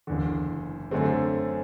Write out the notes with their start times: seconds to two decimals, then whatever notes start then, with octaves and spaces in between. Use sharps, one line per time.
0.07 F#1 E2 D3
0.91 F#2 D3 A3 C4